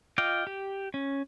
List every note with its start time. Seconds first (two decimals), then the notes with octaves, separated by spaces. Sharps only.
0.18 F4 D#5 F5 G5 D6
0.47 G4
0.94 C#4